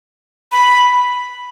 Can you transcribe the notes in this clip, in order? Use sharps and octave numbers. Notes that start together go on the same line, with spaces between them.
B5